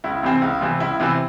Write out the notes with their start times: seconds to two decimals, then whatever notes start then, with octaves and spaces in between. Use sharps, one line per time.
0.04 C#2 E4
0.23 C3 E3 C4
0.42 C#2
0.61 C3 E3 C4
0.80 C#2 E4
1.00 C3 E3 C4